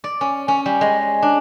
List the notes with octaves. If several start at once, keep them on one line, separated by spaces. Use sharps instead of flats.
D5
C#4
C#4
G3
G#3
D4